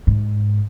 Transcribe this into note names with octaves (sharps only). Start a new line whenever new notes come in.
G#2